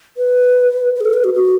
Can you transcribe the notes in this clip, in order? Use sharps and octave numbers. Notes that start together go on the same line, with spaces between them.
B4
B4
G#4
A4
B4
F#4
F#4